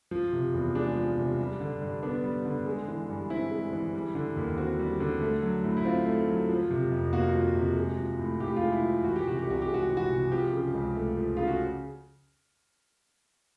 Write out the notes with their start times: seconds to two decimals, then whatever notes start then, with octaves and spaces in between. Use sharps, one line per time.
0.11 F3
0.33 C3
0.54 E2
0.75 G#3 D4
0.96 F3
1.18 C3
1.38 G3
1.60 D3
1.81 G2
2.03 B3 D4
2.24 G3
2.45 D3
2.66 G#3
2.88 E3
3.09 G2
3.30 C4 E4
3.51 G#3
3.73 E3
3.94 G3
4.15 D3
4.36 D#2
4.58 C4 F#4
4.79 G3
5.00 D3
5.21 A3
5.42 F#3
5.64 A2
5.77 E4
5.85 C4 F4
6.06 A3
6.28 F#3
6.49 F3
6.70 C3
6.92 F2
7.13 A#3 F#4
7.34 F3
7.55 C3
7.77 G#3
7.98 F3
8.19 A2
8.40 A2 G4
8.56 F4
8.61 G#3
8.72 E4
8.83 F3
9.04 E3 F#4
9.16 G4
9.25 C3 F#4
9.39 G4
9.47 C2 F#4
9.62 G4
9.68 G#3
9.74 F#4
9.85 E3 G4
9.97 F#4
10.10 C3
10.31 F3 G4
10.53 C#3
10.74 C#2
10.95 A3
11.17 F3
11.37 C#3 F4
11.47 F#4